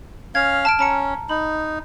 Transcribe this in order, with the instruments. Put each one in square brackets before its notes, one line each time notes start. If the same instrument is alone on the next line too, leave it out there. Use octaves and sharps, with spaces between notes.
[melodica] C#4 F5 [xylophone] G#6
[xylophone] A5 F6 D7
[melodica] C#4 [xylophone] A5 A#5 C#7
[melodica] D#4 [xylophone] B5